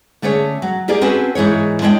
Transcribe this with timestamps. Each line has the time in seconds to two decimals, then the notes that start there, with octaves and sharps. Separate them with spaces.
0.22 D3 A3 C#4 G#4 C#5
0.62 F#3
0.88 A#3 G4 G#4 A#4 D5
1.01 C4 C#4 F#4 G#4 A4 B4
1.35 G#2 E3 G#4 C#5
1.82 G#3 D4 C#5 D#5 E5 G5